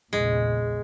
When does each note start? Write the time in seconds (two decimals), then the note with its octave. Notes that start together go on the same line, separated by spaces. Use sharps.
0.13 A#1 E2 C#3 G#3